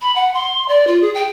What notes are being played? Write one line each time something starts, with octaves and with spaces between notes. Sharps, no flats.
B5
F#5
C6
D5
F4
G#4
G5